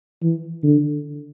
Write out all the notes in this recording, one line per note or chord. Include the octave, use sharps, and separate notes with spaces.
E3
D3